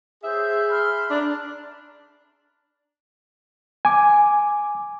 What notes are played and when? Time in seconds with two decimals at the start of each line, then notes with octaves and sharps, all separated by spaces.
0.24 G#4 C5 C#5 E5 G6
0.69 B5 C6 F6
1.11 D4 D5 A#5
3.85 G#5 D6